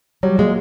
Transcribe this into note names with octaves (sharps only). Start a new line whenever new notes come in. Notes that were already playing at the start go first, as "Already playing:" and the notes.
F#3 G3
A#2 G#3